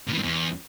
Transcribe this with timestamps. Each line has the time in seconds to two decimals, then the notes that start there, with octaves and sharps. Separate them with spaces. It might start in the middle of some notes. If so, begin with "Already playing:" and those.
0.07 A#2
0.12 E3
0.17 G2
0.23 E2